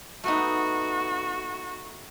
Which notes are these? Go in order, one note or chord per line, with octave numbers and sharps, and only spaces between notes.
A3 B3 D#4 F#4